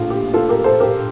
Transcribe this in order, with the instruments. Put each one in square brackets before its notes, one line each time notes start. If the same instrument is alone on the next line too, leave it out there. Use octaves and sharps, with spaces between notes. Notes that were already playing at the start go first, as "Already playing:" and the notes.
Already playing: [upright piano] A#1 A2 F4
G4
F4 A4
G4 A#4
A4 C5
G4 A#4